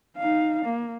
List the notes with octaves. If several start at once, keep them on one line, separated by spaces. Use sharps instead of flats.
D#4 F5
A#3